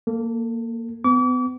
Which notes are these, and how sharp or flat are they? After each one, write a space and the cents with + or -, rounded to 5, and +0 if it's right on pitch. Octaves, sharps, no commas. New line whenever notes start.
A#3 -10 A4 +20
B3 +35 D6 -40